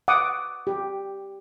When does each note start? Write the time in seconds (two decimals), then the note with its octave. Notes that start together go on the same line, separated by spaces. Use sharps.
0.08 F#5 D6 D#6
0.67 G4